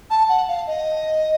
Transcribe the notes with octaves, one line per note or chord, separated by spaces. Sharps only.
A5
F#5
F5
D#5